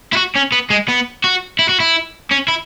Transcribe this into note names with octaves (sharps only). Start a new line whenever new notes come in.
E4
F#4
C#4
B3
G#3
B3
F#4
E4
F#4
E4
C#4
E4